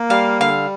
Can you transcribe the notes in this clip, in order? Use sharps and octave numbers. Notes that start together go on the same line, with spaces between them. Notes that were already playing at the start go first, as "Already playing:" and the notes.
Already playing: A#3
G3 F5
D3 F5